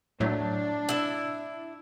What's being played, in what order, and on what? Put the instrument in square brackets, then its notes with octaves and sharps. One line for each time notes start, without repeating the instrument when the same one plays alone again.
[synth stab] A2 F#3 A3 [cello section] D4
[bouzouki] E4 E5